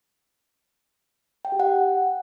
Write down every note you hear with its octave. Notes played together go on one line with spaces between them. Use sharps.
G5
G4
F#5